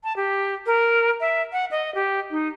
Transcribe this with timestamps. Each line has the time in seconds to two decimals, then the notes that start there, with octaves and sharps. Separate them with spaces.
0.04 A5
0.16 G4
0.66 A#4
1.20 E5
1.52 F#5
1.71 D#5
1.95 G4
2.31 D#4